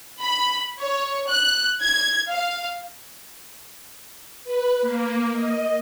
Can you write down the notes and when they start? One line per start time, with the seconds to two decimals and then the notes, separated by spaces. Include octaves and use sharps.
0.19 B5
0.80 C#5
1.28 F#6
1.80 G#6
2.29 F5
4.44 B4
4.81 A#3
5.33 D#5